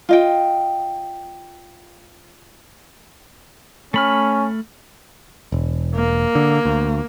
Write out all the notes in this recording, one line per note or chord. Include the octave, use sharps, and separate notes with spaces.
F4 D#5 G5
A3 C#4 B5 F6
E1
A#3
D3
D2